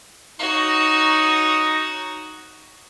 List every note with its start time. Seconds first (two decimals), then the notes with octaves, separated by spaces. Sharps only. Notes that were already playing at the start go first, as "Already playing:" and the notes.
0.39 D#4 F#4 C#5